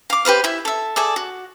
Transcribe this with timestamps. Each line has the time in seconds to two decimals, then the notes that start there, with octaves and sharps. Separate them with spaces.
0.10 F5 D6
0.25 G4 B4 C5 F5
0.44 E4 E5
0.65 A4 E5
0.96 G#4 A4 D5 E5
1.16 F#4